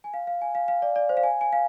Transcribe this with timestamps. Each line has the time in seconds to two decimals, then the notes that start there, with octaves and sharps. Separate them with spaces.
0.04 G#5
0.14 F5
0.27 F5
0.42 G#5
0.55 F5
0.68 F5
0.82 D5
0.96 D5
1.09 C5
1.17 F5
1.23 G#5
1.41 G#5
1.53 F5